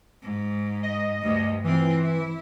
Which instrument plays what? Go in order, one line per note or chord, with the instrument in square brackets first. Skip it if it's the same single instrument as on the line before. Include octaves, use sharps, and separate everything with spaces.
[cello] G#2
[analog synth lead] D#5
[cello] D2 G2
[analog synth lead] E3 [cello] C4 F4
[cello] E4